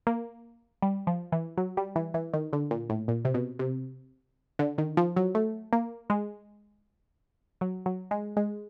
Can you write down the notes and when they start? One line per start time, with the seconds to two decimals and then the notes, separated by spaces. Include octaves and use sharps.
0.07 A#3
0.82 G3
1.07 F3
1.32 E3
1.57 F#3
1.77 G3
1.96 E3
2.14 E3
2.34 D#3
2.53 D3
2.71 A#2
2.90 A2
3.08 A#2
3.25 C3
3.34 B2
3.59 C3
4.59 D3
4.78 D#3
4.97 F3
5.16 F#3
5.35 A3
5.73 A#3
6.10 G#3
7.61 F#3
7.86 F#3
8.11 G#3
8.37 G#3